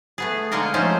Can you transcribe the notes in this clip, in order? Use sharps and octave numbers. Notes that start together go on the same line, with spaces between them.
A3 B3 G#4
D3 G#3 A#3 D#4 A4 A#4
F3 G#3 A3 C#4 D#4 C5